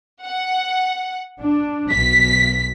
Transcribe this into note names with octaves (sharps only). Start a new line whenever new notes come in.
F#5
D4
B1 B6